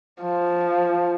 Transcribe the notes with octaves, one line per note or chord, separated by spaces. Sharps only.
F3